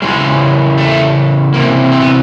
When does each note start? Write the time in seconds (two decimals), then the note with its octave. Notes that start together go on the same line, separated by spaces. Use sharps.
0.02 C#3 E3 G#3
0.78 A3
1.54 C3 E3 A#3
1.92 C4
2.00 B3